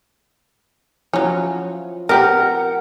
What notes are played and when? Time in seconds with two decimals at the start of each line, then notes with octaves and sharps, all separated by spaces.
1.13 F3 F#3 C#4 E4 F4
2.09 C4 G4 A#4 B4 F#5